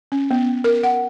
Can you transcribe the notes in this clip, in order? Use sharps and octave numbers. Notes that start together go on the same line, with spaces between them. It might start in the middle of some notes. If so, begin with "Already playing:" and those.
C#4
B3
A#4
F#5